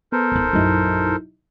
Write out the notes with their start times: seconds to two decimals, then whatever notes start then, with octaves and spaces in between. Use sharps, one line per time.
0.12 B3 A4 A#4 C5
0.32 D1 D#4
0.53 A#1 F#2 F#3 D#4 E4